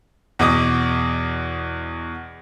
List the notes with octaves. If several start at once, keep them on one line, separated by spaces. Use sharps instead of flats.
E2 B2 D#5 D6 D#6